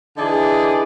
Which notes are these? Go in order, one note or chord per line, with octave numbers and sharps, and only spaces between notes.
D3 E3 D#4 G#4 D5